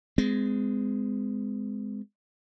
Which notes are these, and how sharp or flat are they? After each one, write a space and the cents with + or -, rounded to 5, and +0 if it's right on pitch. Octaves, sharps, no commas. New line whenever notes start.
G#3 +0 C4 -40